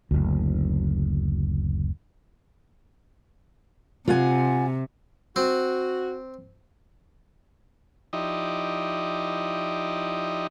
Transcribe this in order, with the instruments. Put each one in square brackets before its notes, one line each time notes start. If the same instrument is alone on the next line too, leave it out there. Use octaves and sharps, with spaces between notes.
[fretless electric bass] F#1 D2
[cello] C3 [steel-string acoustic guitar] F4 F#5 G#5
[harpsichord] C4 [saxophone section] F#4
[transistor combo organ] F3 D#4 E4 G4 D5 D#5